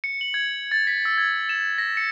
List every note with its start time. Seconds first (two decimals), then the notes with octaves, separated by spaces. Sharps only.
0.04 C#7
0.21 F#7
0.34 G#6
0.71 A6
0.87 B6
1.05 E6
1.18 G#6
1.49 E7
1.78 A#6
1.97 C#7